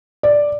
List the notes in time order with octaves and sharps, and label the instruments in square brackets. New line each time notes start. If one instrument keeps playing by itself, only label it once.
[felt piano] D5